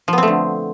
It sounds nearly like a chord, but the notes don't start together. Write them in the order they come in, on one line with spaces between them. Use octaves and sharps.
F3 B3 C4 A3 D3